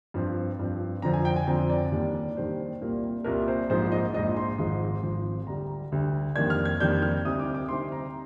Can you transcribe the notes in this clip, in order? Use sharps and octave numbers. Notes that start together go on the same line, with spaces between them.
G2 F3 C4
G2 F3 C4
F2 D3 F3 C4 A#5
G#5
G5
G#5
F2 D3 F3 C4 A#5
D5
D#2 D#3 G3 D4 D5
D5
D#2 D#3 G3 D4 C5
C2 A#2 G3 A#3
C2 A#2 G3 A#3 A#4
C5
A#1 G#2 F3 C5
D#5
A#1 G#2 F3 D#5
C6
G#1 G#2 F3 C6
G#1 G#2 F3
D2 D3 G3 A#5
D2 D3 G3
F2 D#3 G3 A#3 D4 G#6
F6
G#6
F2 D#3 G3 A#3 D4 G6
F6
D2 C3 G3 C4 D#4 D#6
D6
D6
D2 C3 G3 C4 D#4 C6
A#5